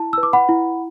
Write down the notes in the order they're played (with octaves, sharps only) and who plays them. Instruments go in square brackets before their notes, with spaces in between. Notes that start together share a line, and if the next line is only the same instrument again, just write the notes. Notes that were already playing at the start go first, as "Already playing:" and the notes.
Already playing: [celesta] E4 A5
B4 E6
D6
F#5 B5
E4